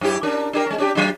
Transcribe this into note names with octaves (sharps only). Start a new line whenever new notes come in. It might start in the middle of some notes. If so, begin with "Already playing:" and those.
F#2 E4 G4
C#4 D4 A#4
D4 G4 A#4
G#3 C#4
C#4 D4 G4
F#3 D4